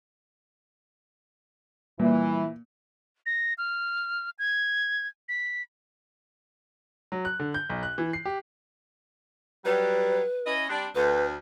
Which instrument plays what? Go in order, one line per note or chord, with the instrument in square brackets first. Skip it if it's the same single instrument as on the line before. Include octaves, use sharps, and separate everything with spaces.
[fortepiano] A#2 [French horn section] E3 [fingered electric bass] G3
[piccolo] A#6
F6
G#6
B6
[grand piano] F#3
F#6
D3
G6
B1
F#6
E3
C7
G4
[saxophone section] F#3 G3 [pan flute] B4
[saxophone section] C#4 E4 D#5
G3 C4 D4
[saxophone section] D2 [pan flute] B4